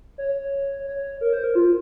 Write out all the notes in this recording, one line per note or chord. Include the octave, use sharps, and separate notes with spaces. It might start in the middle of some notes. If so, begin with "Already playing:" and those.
C#5
C#5
A#4
C5
A#4
F4